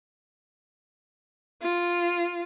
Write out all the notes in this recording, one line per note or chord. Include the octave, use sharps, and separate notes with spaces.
F4